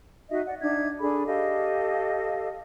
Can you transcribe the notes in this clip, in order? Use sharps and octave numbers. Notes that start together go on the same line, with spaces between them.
D#4 F#4 D#5 E5
D5 F#5
D4 D#4 E5 G#6
D4 G#4 A4 B5
G4 A4 D#5 F5